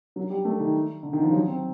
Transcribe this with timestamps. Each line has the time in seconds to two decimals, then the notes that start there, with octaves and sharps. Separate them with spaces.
0.16 F#3
0.30 G3
0.45 A3
0.60 D#3
1.03 D3
1.13 D#3
1.23 F3
1.32 F#3
1.47 C4